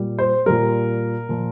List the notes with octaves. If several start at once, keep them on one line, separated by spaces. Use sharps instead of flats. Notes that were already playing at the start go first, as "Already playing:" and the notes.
Already playing: A#2 G3
C5
A#2 G3 A#4
A#2 F3